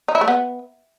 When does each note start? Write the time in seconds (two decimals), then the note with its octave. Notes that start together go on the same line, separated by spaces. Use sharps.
0.08 D#4
0.15 E4
0.21 A3
0.28 B3